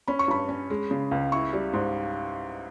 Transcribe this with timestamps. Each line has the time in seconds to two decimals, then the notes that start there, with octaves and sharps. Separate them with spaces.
0.08 C#4 B5
0.19 C#6
0.28 G2 B5
0.49 C#4
0.70 G#3
0.91 C#3
1.11 C#2
1.32 E4 C#6
1.53 G3
1.73 G#2